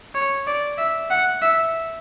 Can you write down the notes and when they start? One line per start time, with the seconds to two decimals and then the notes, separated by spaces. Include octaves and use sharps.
0.15 C#5
0.47 D5
0.78 E5
1.10 F#5
1.42 E5